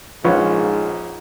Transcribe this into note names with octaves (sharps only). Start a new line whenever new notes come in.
A#1 G#2 C#4 F4 B4 C#6